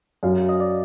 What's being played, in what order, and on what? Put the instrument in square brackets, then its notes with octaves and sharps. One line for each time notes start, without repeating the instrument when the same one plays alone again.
[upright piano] F#2 [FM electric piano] F5
[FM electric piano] D#5
D5